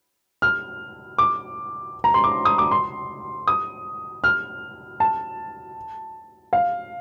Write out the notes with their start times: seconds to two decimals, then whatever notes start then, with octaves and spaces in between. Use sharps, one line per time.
0.42 F6
1.18 D6
2.04 A#5
2.14 C6
2.24 D6
2.45 D#6
2.58 D6
2.71 C6
3.47 D#6
4.24 F6
5.00 A5
6.53 F5